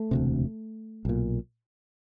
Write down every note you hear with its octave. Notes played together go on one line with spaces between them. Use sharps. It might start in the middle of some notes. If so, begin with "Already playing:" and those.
Already playing: A3
E1 D2 C3
B1 A#2